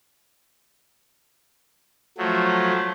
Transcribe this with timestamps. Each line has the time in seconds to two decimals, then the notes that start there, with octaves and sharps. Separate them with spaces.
2.18 F3 F#3 A3